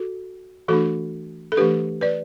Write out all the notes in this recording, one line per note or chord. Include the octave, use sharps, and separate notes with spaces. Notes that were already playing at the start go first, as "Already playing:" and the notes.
Already playing: F#4 A4
E3 A3 D4 F#4 A4
A4
E3 A3 D4 G4 B4
B4 D5